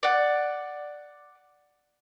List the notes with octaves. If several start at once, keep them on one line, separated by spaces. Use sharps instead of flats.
D5 F#5